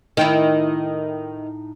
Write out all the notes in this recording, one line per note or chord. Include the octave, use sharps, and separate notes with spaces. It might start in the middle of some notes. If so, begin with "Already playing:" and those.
A2 D#3 D#4 E4 G5